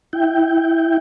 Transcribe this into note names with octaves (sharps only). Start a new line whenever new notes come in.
E4 G5